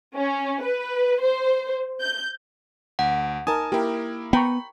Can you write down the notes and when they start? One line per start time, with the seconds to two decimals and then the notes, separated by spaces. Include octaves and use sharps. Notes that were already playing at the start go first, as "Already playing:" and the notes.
0.15 C#4
0.62 B4
1.21 C5
2.01 G6
2.99 D2 F#5
3.47 D#4 A#4 G#5 A5 D#6
3.72 A#3 E4 G4 A#4
4.33 B3 G5 A#5 B5 C#6